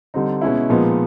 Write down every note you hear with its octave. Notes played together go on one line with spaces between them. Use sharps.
D3 G3 C4 D#4
B2 G#3 C#4 E4
A#2 F3 G#3 B3 D#4